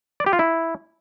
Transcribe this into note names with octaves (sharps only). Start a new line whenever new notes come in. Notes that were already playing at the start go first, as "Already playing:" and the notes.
D5
G4
F4
E4